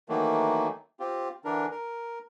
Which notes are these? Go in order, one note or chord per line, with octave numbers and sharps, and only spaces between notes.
D#3 E3 F#3 A3 A#3
C4 F4 G4
D3 E3 D4 A#4
A#4